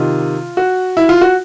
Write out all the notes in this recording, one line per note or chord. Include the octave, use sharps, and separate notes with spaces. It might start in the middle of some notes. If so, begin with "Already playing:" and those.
Already playing: C3 D#3 F4
F#4
E4
F4
F#4